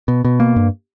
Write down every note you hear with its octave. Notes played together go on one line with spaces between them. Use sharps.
B2
B2
A#3
G2